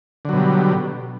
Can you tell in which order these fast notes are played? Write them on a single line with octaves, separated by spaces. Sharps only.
D3 F#3 B2 G3